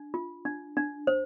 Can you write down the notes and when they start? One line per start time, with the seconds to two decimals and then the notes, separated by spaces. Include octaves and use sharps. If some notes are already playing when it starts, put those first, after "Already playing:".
Already playing: D4
0.14 F4
0.45 D4
0.77 D4
1.07 C5